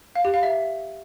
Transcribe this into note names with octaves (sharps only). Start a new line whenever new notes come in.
F5
G4
F5
E5